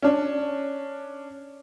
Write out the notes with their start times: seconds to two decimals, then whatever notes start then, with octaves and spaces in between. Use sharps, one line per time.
0.02 C#4 D4